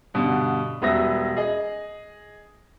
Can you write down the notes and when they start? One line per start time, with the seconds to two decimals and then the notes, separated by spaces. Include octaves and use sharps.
0.14 G2 B2 D3
0.82 E1 G3 B4 E5 D#6 A#6
1.37 G#4 D#5